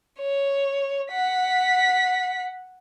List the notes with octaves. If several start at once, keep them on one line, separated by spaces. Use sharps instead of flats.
C#5
F#5 B6